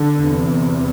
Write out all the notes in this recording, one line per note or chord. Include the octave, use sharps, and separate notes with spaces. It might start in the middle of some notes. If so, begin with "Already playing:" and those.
Already playing: D3
E2 C3